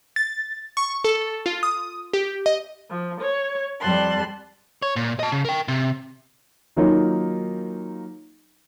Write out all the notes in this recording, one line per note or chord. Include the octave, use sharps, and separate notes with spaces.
A6
C#6
A4
F4
D#6
G4
D#5
F3
C#5
F2 G3 A5 C6 F#6
C#5
A#2
D#5 A5
C#3
A#4 G5
C3
D#3 F#3 A#3 C#4 D#4 F4